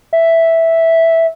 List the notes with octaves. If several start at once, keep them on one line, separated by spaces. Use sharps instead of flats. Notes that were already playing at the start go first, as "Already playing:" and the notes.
E5